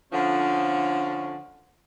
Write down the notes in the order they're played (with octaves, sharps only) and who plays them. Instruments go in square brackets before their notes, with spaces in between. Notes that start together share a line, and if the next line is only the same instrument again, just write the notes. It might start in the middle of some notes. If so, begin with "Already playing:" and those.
[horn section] D3 F3 C#4